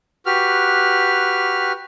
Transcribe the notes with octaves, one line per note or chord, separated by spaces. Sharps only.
F#4 G4 B4 F6